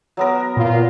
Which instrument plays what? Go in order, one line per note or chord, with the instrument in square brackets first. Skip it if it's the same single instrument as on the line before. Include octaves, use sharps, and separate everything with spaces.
[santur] F#3 B3 A#4
[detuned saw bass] A#2 [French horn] F4